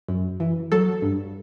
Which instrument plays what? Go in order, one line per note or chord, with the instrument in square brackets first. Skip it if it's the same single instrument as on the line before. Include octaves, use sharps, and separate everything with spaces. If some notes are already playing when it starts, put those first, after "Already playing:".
[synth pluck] F#2
E3
F#3 A4
G2